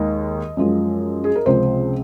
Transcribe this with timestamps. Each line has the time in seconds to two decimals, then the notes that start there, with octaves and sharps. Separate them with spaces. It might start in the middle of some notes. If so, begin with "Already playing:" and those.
Already playing: D#2 D#3 G#3 D#5
0.57 F#2 F3 G#3
1.24 G#4
1.36 A#4
1.46 C#2 C3 F3 G#3 C5